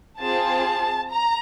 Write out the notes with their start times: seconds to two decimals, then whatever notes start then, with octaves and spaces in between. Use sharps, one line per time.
0.19 C4 F4 G#4 A5
1.11 A#5